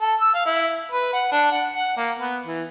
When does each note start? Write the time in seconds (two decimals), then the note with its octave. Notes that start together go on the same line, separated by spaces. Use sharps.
0.01 A4
0.21 E6
0.35 F5
0.46 E4
0.92 B4
1.13 F#5
1.32 D4
1.52 F#5
1.73 F#5
1.97 A#3
2.19 B3
2.46 E3